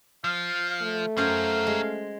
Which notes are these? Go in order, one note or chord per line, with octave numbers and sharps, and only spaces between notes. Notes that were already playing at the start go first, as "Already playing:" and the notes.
F3 F5
A3
F#2 F#4 A#4 C5 F5 G#5
G#3